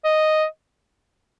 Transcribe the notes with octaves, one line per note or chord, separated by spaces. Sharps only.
D#5